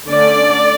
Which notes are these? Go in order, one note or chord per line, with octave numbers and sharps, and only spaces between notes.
D3 A3 C#4 D5